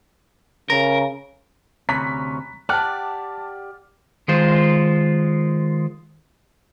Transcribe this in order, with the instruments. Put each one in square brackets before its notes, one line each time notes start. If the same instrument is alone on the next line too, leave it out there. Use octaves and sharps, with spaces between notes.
[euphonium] C#3 [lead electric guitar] A#4
[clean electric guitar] D2 C3 C#4 [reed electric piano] A#5 B5 F#6 [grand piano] B6
[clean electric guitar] G4 F#5 [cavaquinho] D5 [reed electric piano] G5 [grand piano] A5 F6
[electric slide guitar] D#3 G#3 F4 C5